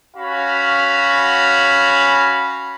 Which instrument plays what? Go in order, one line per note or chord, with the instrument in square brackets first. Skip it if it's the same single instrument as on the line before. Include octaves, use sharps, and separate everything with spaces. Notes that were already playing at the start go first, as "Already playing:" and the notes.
[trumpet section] C#4 F#4 F5 B5